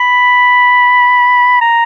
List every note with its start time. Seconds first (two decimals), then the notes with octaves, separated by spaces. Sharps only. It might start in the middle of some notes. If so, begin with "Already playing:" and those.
Already playing: B5
1.61 A#5